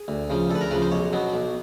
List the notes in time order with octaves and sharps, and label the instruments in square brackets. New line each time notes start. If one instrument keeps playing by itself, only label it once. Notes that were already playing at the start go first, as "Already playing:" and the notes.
Already playing: [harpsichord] G#4
D2
C#3 F3
D2 A4
B4
A#4
C#3 F3 B4
C5
B1 C#5
B2 F#3 B3
B1